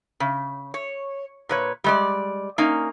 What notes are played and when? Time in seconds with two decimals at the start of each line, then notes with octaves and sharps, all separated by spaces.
0.20 C#3
0.74 C#5
1.49 A#2 B4 C#5
1.84 G3 G#3 D5
2.58 A#3 C#4 D#4